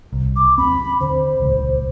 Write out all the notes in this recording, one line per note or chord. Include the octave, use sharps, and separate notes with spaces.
C2
D6
D#2 C4 B5
D3 C5
D#1 C#2